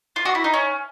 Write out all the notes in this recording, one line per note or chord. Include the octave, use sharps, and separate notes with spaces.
F4
F#4
E4
D#4
C#4